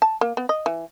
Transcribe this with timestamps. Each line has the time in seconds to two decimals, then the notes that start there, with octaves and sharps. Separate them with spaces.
0.02 A5
0.21 A#3
0.37 B3
0.49 D#5
0.66 E3